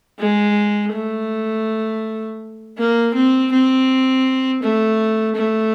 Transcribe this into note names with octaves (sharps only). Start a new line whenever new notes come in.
G#3
A3
A#3
C4
C4
A3
A3